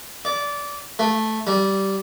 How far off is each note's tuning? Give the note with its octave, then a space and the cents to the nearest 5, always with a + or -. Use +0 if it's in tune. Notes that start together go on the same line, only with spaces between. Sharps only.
D5 -20
A3 -5
G3 -15